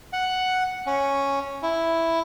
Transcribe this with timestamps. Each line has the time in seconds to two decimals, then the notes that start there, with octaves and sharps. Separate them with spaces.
0.13 F#5
0.87 C#4
1.63 E4